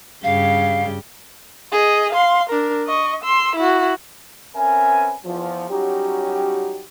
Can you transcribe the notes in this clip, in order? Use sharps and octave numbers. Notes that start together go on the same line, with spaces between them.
G2 C#3 G4 F5
G#4 D#5
F5 C6
D4 A#4
D#5 C#6
C6 E6
E4 F#4
C4 C#4 A#4 B4 E5 G#5
E2 F3
F#3 G3 C#4 D#4 F#4 G4